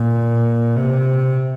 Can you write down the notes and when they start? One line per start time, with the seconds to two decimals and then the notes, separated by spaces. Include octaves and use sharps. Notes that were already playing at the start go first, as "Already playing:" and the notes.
Already playing: A#2
0.76 C3